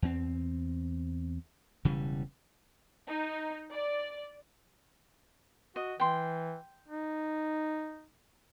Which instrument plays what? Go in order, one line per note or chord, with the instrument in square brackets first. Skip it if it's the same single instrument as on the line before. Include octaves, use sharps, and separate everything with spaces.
[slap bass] E2 C4
E1 C#3 E3 G3
[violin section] D#4
D5
[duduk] F#4 [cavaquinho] D#5
[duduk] E3 [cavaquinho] G5 C6
[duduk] D#4